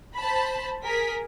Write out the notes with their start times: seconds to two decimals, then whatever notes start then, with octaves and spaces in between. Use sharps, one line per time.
0.16 C5 A5 B5
0.84 G#4 A#4 B6